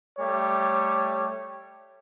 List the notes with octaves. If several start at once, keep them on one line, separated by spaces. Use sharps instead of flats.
G3 A3 C#5 D6